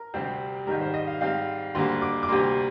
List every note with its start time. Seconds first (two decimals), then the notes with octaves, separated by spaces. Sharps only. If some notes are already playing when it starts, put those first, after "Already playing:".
Already playing: A#4
0.14 D2 C3 G3 C4
0.67 G#2 D#3 G3 A#4
0.81 C5
0.94 D#5
1.07 F5
1.21 G#2 G3 C4 F5
1.75 D2 D3 G3 A#3 C6
2.02 D6
2.23 D6
2.29 D2 C3 G3 A#3 C6